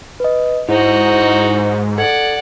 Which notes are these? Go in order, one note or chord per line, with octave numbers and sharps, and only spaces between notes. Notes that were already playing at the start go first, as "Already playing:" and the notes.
B4 D#5
G#2 D#4 E4 F#4 C5
A4 D5 F#5 G#6